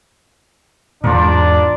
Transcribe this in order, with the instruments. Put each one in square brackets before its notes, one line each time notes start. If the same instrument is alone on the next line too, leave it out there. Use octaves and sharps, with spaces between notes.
[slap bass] E2 G#2 [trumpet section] D4 D5 [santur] F4 A#4